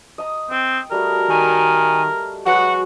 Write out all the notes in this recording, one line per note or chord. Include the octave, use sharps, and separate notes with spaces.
D#5 A#5
C4 G5
G3 A3 F#4 A#4
D#3 G#5
F#3 G#3 F#4 B4 F#5